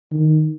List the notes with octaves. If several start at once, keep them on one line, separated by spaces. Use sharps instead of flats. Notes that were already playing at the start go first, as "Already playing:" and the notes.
D#3